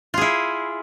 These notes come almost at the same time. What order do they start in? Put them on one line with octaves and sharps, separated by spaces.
F4 G#4 E4